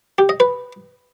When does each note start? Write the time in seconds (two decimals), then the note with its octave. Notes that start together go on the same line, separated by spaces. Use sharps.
0.18 G4
0.29 D#5
0.40 B4